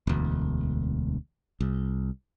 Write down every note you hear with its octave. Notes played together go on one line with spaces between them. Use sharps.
E1 D2
C2